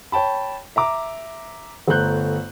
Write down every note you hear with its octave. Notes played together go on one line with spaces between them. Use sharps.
C#5 G5 A5 B5
E5 A#5 D6
G1 A3 C5 A#5 F#6 G6